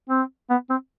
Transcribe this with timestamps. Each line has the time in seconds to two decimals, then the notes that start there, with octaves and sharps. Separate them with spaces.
0.10 C4
0.50 B3
0.70 C4